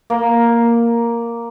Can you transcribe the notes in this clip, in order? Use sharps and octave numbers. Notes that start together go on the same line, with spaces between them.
A#3